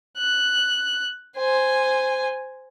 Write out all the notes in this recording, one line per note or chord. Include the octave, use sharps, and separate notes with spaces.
F#6
C5 G#5